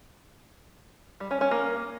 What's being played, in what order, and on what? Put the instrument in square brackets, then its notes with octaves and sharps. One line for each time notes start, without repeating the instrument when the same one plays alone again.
[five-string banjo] G3
C#4
C#4
A#3